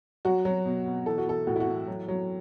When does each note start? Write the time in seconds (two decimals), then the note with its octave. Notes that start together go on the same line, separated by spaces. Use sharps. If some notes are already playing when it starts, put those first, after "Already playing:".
0.25 F#3 F#4
0.45 F#3
0.65 B2
0.86 B2
1.06 E3 A4
1.18 F#4
1.27 E3 A4
1.47 A2 F#4
1.56 E4
1.60 F#4
1.68 E3
1.88 F#3
2.08 F#3